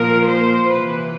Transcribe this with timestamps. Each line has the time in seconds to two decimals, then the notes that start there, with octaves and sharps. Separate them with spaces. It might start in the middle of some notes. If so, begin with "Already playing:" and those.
Already playing: A#2 F3 A#4
0.28 C5
0.69 C3 E3 B4